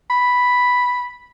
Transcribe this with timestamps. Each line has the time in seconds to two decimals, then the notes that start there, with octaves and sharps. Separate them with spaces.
0.10 B5